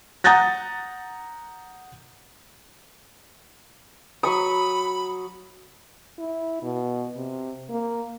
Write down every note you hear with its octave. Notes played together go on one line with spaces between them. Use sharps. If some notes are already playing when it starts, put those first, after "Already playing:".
F#5 A#5 D#6 G6 A6 A#6
F#3 B5 C#6 D#6
E4
B2
C3
A#3